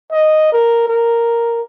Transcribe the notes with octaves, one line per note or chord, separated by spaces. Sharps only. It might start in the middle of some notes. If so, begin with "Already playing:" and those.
D#5
A#4
A#4